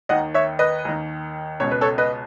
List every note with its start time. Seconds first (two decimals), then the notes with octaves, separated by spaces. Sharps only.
0.09 D#2 D#3 D#5 F#5
0.34 C#5 E5
0.59 B4 D#5
0.85 D#2 D#3
1.60 C#2 B2 C#5
1.71 B4
1.81 A4 C#5
1.98 B4 D#5